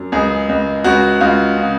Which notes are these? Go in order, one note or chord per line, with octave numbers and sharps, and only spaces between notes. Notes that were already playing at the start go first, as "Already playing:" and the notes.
Already playing: F#2
C#2 G#4
C#2
C#2 F#4
C#2 F4
C#3